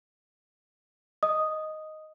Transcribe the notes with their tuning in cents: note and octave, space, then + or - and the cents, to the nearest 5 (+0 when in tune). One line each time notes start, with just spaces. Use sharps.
D#5 +0 D#6 +0